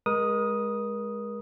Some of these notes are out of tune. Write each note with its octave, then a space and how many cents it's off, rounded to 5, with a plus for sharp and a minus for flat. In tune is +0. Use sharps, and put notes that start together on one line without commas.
G#3 +0 A#4 +40 D#6 +0